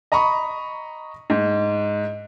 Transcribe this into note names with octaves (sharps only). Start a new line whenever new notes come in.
D#5 A#5 B5 C#6
G#2